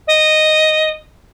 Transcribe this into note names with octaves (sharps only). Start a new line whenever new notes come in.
D#5